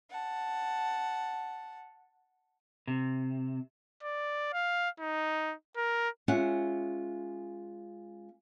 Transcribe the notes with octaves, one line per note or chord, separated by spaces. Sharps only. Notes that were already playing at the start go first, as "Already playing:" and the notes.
F#5 A5
C3
D5
F5
D#4
A#4
G#3 C#4 F4 E5 F#5